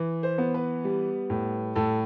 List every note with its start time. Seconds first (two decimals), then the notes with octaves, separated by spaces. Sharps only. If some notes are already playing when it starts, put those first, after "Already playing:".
Already playing: E3
0.23 C5
0.38 B3
0.54 B4
0.84 G3
1.30 A2
1.75 A2 A4